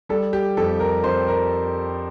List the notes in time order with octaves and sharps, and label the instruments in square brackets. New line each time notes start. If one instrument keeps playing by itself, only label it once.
[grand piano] G3 A4
G4
F2 A4
A#4
F2 C5
A#4